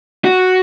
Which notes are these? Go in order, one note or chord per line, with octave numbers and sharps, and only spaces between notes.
F#4